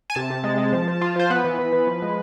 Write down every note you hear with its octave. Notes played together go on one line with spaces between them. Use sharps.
G#5
C3 A5
C3
G#3
G#3
F3
F3
F4
F3 C5
B3 B4
E3
E3
E3
F3
G#3